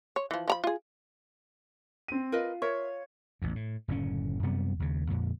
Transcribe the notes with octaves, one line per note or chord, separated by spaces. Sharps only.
C#5
E3 F3
F3 A#5 B5
F4 G#4
C4 D#7
F4 A#4 B4 D#5
A#4 C#5 E5
A1 E2
A2
F#1 A2 D3 C#4
F#2 C3 G3 B3
D#2 C#3
F2 A#2 D3